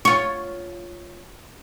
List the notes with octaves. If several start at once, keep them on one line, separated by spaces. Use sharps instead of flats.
F4 C#5